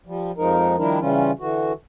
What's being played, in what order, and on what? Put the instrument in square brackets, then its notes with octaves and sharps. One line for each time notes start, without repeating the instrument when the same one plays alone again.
[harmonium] F3 G3
F2 F3 G#3 D#4 A#4
D#3 F3 G3 D4 E4 A#4
C#3 E3 G3 C#4 F4
D3 E3 F#4